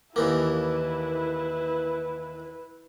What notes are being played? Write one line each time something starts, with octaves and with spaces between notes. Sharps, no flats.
D#2 E3 A#3 E4 B4